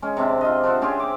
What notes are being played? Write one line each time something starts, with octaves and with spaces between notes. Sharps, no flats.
G#3 C#4
C3 C4 D4
F4 D#5
D4 C5 E5 F#5
C4 C#4 G4 G#4
D6